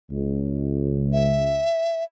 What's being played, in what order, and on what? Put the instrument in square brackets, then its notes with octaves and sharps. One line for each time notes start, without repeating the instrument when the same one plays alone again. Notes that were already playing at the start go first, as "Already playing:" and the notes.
[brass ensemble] C#2
[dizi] E5